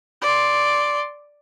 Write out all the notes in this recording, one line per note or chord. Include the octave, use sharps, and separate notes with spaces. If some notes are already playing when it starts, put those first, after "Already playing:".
D5 C6